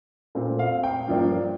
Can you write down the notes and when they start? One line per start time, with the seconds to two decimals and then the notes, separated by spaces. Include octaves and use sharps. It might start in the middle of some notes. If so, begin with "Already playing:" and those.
0.35 A#2 A3 C4
0.59 F5
0.83 G5
1.08 G2 F3 A#3 D4